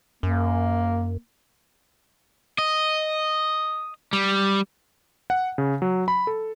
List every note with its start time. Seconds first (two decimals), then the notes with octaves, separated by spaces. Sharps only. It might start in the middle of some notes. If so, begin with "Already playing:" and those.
0.23 F#2 A#3
2.59 D#5
4.13 G3
5.30 F#5
5.58 C#3
5.82 F#3
6.08 B5
6.27 A4